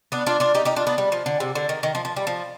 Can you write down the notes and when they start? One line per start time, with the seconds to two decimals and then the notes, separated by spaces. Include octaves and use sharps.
0.12 B3 D4
0.26 D4 F4
0.40 D4 F4
0.55 D#4 G4
0.65 D#4 G4
0.76 D4 F4
0.87 B3 D4
0.98 G3
1.12 F3
1.26 D3
1.40 C3
1.55 D3
1.69 D#3
1.83 D#3
1.95 F3
2.05 F3
2.16 G3
2.27 F3